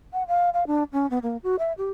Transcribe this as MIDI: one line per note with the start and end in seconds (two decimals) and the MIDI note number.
0.13 0.23 78
0.28 0.50 77
0.54 0.64 77
0.67 0.83 62
0.93 1.09 61
1.10 1.19 59
1.22 1.37 58
1.43 1.56 66
1.59 1.73 76
1.78 1.92 67